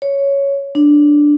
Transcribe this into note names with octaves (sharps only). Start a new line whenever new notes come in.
C#5
D4